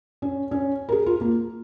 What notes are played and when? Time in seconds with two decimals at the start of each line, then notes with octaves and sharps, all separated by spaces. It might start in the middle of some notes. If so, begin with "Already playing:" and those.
0.22 C#4
0.51 C#4
0.89 A#4
0.92 G#4
1.06 F4
1.21 A#3